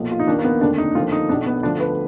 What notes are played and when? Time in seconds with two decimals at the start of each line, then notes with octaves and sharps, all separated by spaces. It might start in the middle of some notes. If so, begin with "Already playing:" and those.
Already playing: B1 A#2 F3
0.11 F4
0.19 D#4
0.27 D#2 D#3 D4
0.38 A#3
0.44 B3
0.61 F1 D#2 D3 D4
0.78 D#4
0.95 D#2 D3 F3 F4
1.12 D#4
1.29 B2 D4
1.33 B1
1.46 B3
1.63 D2 D3 F3 D4
1.80 B4